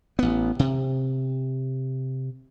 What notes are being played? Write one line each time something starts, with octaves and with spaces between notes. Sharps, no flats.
A1 B3
C3